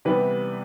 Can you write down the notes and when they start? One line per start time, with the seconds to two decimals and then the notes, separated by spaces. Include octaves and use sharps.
0.05 C3 E3 G3 B3 B4